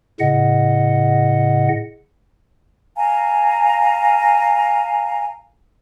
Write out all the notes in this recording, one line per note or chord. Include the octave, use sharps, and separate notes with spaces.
A2 C#3 D#5 F#5
F5 G#5 A#5